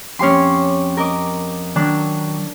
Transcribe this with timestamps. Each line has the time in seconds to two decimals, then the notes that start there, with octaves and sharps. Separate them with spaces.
0.19 F2 C#4 G4 C#5 C6
0.97 A#4 D#5 D6
1.76 D#3 F#3 D4